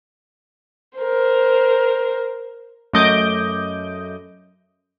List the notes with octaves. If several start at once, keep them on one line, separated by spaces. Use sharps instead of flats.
A#4 C5
F#2 A3 D#5 D6 G6